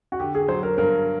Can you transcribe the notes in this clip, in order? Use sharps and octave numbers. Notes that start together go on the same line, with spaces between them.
F#4
D3 G4
G#4
F#3 C5
A#4
G2 A#4